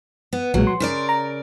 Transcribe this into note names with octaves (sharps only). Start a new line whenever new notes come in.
B3
B1 A#2 F#3 G#3
C6
C#3 A#4 D5
A#5